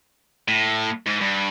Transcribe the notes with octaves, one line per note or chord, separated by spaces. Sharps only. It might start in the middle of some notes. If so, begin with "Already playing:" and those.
A2
G#2
G2